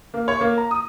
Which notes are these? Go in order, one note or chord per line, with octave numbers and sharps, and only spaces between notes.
A#3
C#5
A#3
A#5
D#6